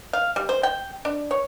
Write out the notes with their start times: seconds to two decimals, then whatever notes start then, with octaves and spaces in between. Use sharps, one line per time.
0.13 F5
0.36 G3
0.49 C5
0.63 G5
1.05 D4
1.31 C#5